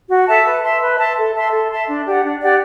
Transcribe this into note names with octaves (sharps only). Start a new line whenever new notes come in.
F#4
A4 E5 A5
B4
E5 A5 C6
B4
E5 A5 C6
A4
E5 A5 C6
A4
E5 A5 C6
D4
G4 D5 F#5
D4
G4 D5 F#5